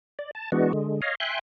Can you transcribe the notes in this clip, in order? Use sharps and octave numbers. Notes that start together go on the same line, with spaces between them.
D5
A5
E3 G#3 B3 D4 F#4
D3 G#3
C#5 D#5 F5
E5 G5 G#5 C6 F#6